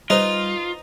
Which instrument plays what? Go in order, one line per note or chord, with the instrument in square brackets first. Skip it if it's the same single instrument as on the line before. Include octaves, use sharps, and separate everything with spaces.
[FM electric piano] G3 [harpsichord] D#4 [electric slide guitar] F4 [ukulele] B4 C5